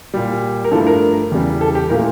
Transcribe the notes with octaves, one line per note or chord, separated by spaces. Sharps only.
A#2 G3
A#4
G2 F3 A3 A4
A#4
E2 C#3 G3
A4
G4
A#2 F3 A3 A#4